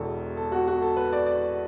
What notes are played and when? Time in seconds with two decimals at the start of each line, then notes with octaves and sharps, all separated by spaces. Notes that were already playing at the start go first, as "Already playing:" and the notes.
Already playing: E1 E2 B2 A4
0.37 A4
0.52 F#4
0.67 F#4
0.82 A4
0.97 B4
1.13 D5
1.26 D5